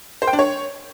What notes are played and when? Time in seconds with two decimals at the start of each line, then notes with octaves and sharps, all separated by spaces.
0.22 C5
0.27 G5
0.33 D4
0.39 C#5